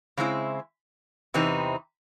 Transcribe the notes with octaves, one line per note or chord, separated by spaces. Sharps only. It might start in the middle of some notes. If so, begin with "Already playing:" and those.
C#3 G#3 C4 E4
E2 C3 E3 C4 D#4